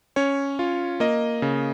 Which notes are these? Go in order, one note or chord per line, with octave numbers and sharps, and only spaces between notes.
C#4 C#5
F4
A#3 D#5
C#3